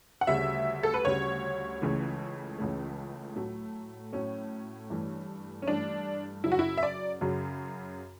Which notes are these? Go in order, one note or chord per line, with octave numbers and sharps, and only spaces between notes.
F#5
D2 C#3 G3 E5
A4
B4
D2 C#3 G3 C#5
C#2 C#3 E3 A3
C#2 C#3 E3 A3
A2 F#3 A3
A2 F#3 A3 C#4
G2 E3 A3
C#4
G2 E3 A3 D4
F#2 C#3 F#3 E4
F#4
E4
E5
D5
F#2 C#3 F#3